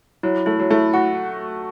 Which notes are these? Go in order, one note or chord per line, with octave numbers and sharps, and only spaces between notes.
F#3 E4
A3 E4
F#3
A3 E4
F#4 F#5